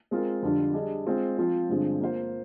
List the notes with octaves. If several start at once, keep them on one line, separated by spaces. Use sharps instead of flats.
G#3 C4 F4 A#4
F2 D3 G3 D4 F4
G3 D4 G#4 D#5
G#3 C4 F4
F3 C4 F4
G2 D3 F3 G#3 C4
A#3 F4 C5